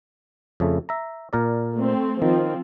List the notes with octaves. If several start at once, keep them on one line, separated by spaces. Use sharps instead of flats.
F2 C#3 A3
E5 A#5
A#2 A#4 D5
A3 C4
D#3 F3 C4